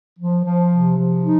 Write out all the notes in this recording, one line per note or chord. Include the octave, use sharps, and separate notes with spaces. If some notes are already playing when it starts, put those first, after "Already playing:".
F3
F3
C3
F3
D#4